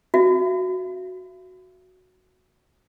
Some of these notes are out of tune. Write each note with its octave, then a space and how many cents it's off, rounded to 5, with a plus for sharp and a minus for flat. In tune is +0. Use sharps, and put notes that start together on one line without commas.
F#4 -5 E5 +40